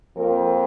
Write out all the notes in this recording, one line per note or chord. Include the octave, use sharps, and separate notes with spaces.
F2 F3 A#3 A#4